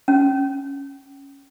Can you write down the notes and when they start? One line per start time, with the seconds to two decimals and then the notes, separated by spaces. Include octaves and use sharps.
0.08 C#4